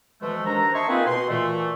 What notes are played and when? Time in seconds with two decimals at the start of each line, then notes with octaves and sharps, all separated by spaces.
0.22 B2 E3 F3 G#3 A3
0.46 D#2 D4 C5 A#5
0.74 D#5 E5 A5 C6 C#6
0.88 A#3 C4 D#4 F4 G#4 B4
1.06 B2 F#4 C6
1.29 A#2 E3 A3